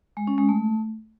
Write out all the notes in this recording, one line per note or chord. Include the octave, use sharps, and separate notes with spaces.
G#3
C#4
G#3
A3